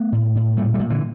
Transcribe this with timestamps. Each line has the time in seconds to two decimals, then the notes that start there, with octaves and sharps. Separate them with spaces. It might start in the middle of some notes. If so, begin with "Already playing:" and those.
Already playing: A3 B3
0.12 A2
0.35 A2
0.57 A#2 G3 A3
0.74 G3 A3
0.79 A#2
0.90 D3 E3